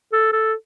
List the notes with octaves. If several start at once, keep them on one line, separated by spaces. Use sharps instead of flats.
A4
A4